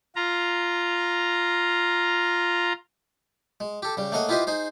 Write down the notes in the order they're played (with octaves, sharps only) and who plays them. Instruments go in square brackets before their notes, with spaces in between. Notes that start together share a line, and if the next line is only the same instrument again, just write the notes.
[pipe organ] F4 A#5
[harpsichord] G#3
G4 A4
C#3 G3
A3 A#3 G#4 C#5 D#5 F#5
E4 F4 G4 B4 C5 D#5
D#4 G#4 C5